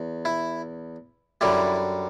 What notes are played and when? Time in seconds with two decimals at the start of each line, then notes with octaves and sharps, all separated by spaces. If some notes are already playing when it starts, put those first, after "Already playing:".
Already playing: E2
0.25 E4
1.41 F#2 D3 G3 E4